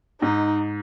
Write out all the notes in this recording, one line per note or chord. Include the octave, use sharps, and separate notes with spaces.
G#2 D#4